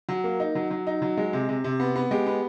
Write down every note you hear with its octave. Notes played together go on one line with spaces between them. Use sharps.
F#3
A#3
D#4
F#3
F#3
D#4
F#3
G#3
C3
C3
C3
B3
B3
G#3 G4
B3